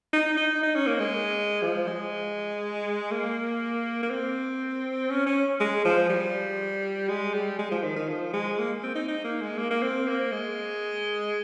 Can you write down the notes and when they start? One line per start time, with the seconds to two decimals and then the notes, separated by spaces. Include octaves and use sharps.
0.13 D#4
0.37 D#4
0.63 D#4
0.75 C#4
0.87 A#3
1.00 G#3
1.62 F3
1.87 G#3
3.11 A#3
4.03 A#3
4.10 C4
5.10 C#4
5.26 C#4
5.60 G#3
5.85 F3
6.10 G3
7.09 G#3
7.34 G3
7.59 G#3
7.71 F3
7.84 D#3
7.96 D#3
8.09 F3
8.33 G#3
8.59 A#3
8.83 C4
8.95 D#4
9.08 D#4
9.24 A#3
9.41 G#3
9.57 A#3
9.71 A#3
9.82 C4
10.08 A#3
10.32 G#3